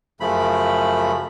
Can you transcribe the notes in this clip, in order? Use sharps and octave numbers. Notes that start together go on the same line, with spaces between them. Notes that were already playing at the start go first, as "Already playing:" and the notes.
F#2 C#3 F3 A3 B5